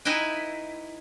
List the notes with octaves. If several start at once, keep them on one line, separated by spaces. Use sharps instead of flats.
D#4 E4 B4 D#5 G5 G#5